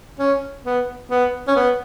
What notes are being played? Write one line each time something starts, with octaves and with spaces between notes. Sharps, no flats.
C#4
B3
B3
C#4
B3